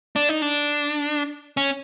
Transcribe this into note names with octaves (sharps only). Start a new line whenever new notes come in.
D4
D#4
D4
C#4